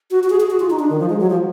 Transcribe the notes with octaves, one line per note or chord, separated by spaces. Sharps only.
F#4
F#4
G#4
G#4
F#4
F4
D#4
D4
D#3
F3
G#3
F#3
F3